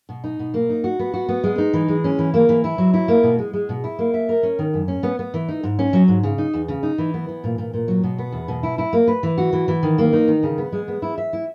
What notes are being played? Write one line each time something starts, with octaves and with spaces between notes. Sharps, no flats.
B2
D#4
B2
A#3
D#4
F#4
B3
F#4
B3
G#3
D#4
E3
G#3
C#4
E3
A#3
E3
E4
F#3
E4
A#3
B2
G#3
G#3
B2
E4
A#3
E5
A#4
C#4
D#3
F#2
C#4
B3
B3
E3
D#4
G#2
C#4
F#3
G#2
C#3
D#4
E2
C#3
D#4
E3
B3
E3
A#2
A#2
A#2
F#3
B2
B3
E2
B2
E4
E4
A#3
B4
E3
F#4
E3
E3
D#3
A#3
D#4
D#3
C#3
B3
G#3
B3
E4
E5
E4